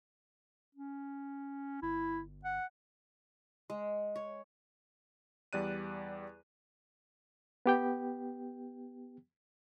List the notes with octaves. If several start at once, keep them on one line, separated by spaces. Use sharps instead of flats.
C#4
G1 E4
F#5
G#3
C#5
E2 G3 D5 F#6 D#7
B3 G4 G5